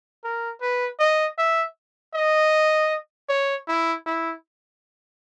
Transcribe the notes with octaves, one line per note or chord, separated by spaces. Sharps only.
A#4
B4
D#5
E5
D#5
C#5
E4
E4